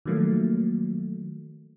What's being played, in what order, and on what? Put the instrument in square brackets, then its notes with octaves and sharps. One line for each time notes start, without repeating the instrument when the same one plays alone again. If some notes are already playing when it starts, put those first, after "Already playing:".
[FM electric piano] D#3 F3 F#3 A3 A#3